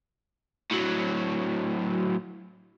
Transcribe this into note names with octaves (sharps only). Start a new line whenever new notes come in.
A2 F#3